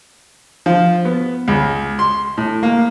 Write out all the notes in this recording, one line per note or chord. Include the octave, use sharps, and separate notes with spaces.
F3
B3
C#2
C6
A2
A#3